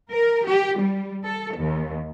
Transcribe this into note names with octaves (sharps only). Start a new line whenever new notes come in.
A#4
G4
G3
A4
D#2